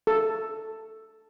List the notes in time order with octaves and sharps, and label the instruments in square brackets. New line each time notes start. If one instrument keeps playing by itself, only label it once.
[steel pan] A4